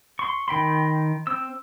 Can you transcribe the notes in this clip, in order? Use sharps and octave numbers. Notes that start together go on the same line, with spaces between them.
C6 C#6
D#3 G5 B5 C6
C4 E6